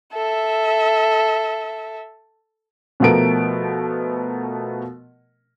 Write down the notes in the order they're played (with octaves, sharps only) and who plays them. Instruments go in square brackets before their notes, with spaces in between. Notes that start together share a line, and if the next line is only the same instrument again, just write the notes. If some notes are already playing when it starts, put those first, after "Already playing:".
[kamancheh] A4 E5
[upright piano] B2 F3 A3 B3 A#4 D7